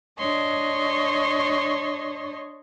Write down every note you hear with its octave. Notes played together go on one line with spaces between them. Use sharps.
D4 C#5 D#5 C6 C#6